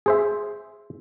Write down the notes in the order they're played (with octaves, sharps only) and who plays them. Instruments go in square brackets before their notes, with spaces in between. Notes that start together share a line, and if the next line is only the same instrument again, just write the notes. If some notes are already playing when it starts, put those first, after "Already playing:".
[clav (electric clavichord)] G#4 C5 E5